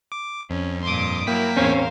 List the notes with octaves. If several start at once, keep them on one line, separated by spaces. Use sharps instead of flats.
D6
F2 C#4
G2 A#2 C6 D6 D#6
F#3 A#3 E4 A#4 G5 B6
E2 A2 C4 C#4 A#4 C5 F5